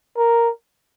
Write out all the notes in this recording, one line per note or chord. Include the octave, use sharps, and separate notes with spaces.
A#4